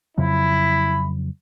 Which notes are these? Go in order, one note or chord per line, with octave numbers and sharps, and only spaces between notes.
F2 C#3 F#3 E4 B5